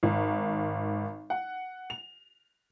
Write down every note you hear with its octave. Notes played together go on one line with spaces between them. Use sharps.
G#1
F#5
F7